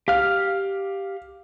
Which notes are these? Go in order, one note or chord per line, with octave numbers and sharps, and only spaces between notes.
G4 F5 F6